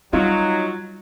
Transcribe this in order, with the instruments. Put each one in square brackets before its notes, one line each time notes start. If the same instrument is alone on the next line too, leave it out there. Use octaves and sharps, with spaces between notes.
[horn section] F#3 [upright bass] G3 [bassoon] D#4 [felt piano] F4